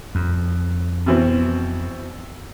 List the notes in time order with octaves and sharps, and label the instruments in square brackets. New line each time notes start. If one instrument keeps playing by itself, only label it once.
[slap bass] F2
[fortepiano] B2 E3 C4